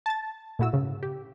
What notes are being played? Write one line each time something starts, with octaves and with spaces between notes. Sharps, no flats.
A5 A6
A#2 A3 E4 F#4 E6
G#2 C#3
G4